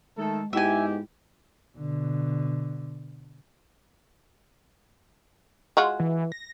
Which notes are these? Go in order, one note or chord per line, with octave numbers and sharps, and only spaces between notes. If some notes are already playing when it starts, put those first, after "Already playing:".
D#3 G#3 A3 A4
G#2 G#3 B3 E4 G4 E5 G#5
B2 D3
G#3 F4 F#4
E3
A#6